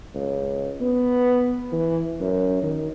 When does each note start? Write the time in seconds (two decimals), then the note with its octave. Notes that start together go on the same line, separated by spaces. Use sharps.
0.14 C#2
0.81 B3
1.72 E3
2.20 F#2
2.63 D#3